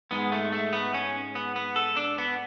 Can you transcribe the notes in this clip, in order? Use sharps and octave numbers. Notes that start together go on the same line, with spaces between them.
G#2 G#3 B3
A3
A3
B3
C#4
B3
B3
A4
D4
B3